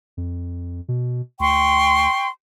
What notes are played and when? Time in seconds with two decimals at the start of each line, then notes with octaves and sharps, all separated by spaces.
0.17 F2
0.88 B2
1.40 D2 G5 C6 C#6